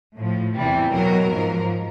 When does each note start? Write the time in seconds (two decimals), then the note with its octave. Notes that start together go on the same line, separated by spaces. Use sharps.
0.16 A2 F3
0.55 E2 C3 E3 G3
0.92 B2 F#3 A#4
1.31 G#2 F3